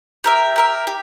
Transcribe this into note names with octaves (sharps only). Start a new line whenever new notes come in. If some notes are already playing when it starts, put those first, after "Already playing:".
G4 A#4 E5
G4 A#4 E5
G4